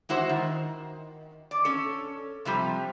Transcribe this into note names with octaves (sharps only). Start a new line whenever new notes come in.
G#3 E4 F#4 C5
D#3
D5
C#4 A4
C3 F3 G3